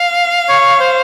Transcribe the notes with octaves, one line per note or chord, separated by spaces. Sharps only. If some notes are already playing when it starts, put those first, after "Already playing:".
Already playing: F5
C#5
C5